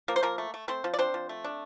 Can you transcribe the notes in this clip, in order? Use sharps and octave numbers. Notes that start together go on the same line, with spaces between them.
F3 A#3 A#4
C5
F3 A#3 A#4
A3
A3
A3 C4 C5
F3
D5
C4 D4 C5
F3
A3
D4